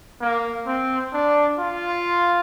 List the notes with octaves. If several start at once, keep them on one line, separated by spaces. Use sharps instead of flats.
A#3
C4
D4
F4